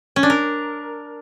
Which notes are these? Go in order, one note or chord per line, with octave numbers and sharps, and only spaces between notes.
C#4
D4
A#4